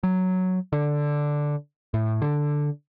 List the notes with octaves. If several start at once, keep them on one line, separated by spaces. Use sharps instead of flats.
F#3
D3
A2
D3